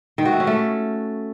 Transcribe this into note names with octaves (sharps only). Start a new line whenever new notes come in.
D#3
F#4
A3
C#4
A3